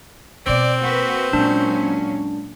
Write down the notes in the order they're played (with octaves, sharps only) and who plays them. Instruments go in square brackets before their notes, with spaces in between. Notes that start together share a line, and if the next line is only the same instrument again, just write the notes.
[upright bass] B2 B3 [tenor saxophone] C4 [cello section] D5
[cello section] A#3 F#4 B4
[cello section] A#2 F#3 C#4 [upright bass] G#3 [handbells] D4